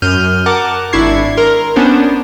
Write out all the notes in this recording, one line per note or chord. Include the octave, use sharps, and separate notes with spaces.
F#2 F6 G6 D#7
A#4 F#5 A5 D6
G#1 D4 E4 C#6 G#6 C7
A#4 C6
B3 C#4 D4 C5